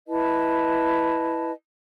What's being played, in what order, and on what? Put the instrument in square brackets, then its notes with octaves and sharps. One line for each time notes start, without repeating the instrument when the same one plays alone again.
[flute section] E4 B4 D#5 A5